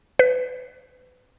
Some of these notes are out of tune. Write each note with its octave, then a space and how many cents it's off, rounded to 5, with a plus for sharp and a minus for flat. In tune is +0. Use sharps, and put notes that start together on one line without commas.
B4 +30